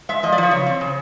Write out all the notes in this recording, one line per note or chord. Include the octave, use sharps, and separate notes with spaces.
G#3 E5
F3 D#5
D5
F3 C#5
C#3
C4
C#3